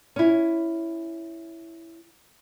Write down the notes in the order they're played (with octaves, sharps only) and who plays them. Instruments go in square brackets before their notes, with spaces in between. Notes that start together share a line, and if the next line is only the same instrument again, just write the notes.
[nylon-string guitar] C#4 E4